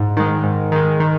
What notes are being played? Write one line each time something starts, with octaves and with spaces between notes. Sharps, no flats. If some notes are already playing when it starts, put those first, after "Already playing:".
Already playing: G#2
D#3 G#3
G#2
D#3 G#3
D#3